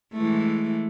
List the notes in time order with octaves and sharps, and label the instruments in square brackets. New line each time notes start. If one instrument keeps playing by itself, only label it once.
[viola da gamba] E3 G#3 A3